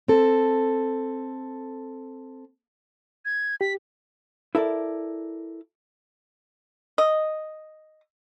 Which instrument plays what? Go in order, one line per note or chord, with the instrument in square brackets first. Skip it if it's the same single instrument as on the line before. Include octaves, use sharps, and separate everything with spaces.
[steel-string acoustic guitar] C4 A4
[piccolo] G#6
[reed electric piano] G4 [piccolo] B6
[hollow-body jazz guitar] E4 A4 A#4 D5
[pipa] D#5